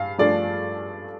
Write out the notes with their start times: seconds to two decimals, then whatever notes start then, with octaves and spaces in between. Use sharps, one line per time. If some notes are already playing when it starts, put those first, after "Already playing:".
Already playing: G2 F5
0.19 G2 F3 A3 D4 D5